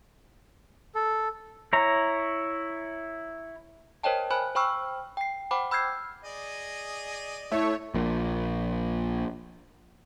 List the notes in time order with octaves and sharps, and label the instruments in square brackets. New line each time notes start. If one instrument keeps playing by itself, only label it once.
[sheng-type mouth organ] A4
[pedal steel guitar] E4 C#5 A#5
[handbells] A#4 C5 C#5 D#5 G5 A5
C5 G#5 B5 F#6
C5 G5 B5 C#6 E6 F6
G5 C7
C5 F#5 G5 B5 D6
B5 E6 F6 G6 G#6 C7
[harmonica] G#4 D5 D#5
[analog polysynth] A3 C#5 [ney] E4 [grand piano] E5
[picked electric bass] A#1 A#2